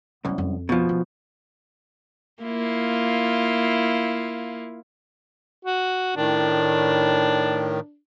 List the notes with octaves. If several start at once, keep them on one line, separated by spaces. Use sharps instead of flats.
C2 F#2 B3 D#4
F2
B2 F3
B3
A#3 E4 F4
F#4
A2 D#3 D4